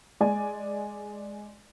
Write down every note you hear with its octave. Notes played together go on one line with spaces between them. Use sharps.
G#3 D5 G#5